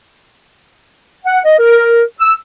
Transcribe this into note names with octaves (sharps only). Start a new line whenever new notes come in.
F#5
D#5
A#4
E6